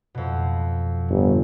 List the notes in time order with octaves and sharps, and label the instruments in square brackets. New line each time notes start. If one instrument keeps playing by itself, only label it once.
[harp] F2 B2
[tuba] G1